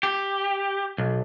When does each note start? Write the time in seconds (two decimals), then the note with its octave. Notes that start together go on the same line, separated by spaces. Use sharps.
0.03 G4
0.98 B1